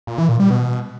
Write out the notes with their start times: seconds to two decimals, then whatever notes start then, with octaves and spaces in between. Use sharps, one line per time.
0.07 A#2
0.18 E3
0.29 A#2
0.40 G3
0.50 B2